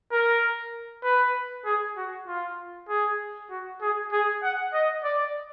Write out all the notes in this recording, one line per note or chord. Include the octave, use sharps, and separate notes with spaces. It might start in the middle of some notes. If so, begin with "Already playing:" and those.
A#4
B4
G#4
F#4
F4
G#4
F#4
G#4
G#4
F#5
D#5
D5